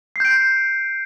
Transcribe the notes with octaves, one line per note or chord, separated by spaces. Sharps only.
G6 C7 D7